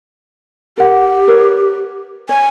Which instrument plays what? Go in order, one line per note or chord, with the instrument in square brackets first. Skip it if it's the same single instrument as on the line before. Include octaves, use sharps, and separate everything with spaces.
[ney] G4 [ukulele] A#4 F#5
[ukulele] A#4 B4 C#5
[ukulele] C#5 [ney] G#5